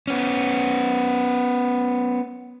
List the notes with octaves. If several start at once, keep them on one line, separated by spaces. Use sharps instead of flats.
B3 C#4